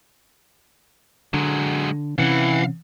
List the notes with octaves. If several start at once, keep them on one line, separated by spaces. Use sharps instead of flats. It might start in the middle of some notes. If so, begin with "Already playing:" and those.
D3 F#3 G#3
C3 E3 C#4 F5 F#5